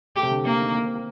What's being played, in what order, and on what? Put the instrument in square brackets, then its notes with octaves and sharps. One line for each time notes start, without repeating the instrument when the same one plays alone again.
[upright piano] A3 [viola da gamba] G4
[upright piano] C3
D3
[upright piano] D3 [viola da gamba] A#3
[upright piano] D#3
A#3
C4
A#3